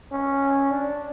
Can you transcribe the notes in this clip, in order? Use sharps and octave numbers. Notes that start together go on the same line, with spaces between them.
C#4
D4